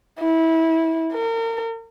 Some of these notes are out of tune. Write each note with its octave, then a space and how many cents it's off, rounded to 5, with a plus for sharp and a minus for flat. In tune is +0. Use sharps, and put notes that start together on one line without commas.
E4 -20
A#4 -35